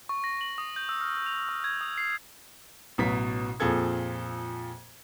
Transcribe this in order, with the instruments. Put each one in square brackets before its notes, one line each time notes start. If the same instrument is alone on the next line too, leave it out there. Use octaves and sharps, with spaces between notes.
[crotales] C#6
A#6
F#7
D#6
G6
E6
F6
F7
C#6
G#6
D#6
C7
[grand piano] A1 B2 F#3 B6
F2 A#2 G#4 A4 G#6